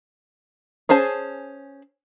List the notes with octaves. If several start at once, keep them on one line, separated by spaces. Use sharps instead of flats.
C#4 G#4 C5 A5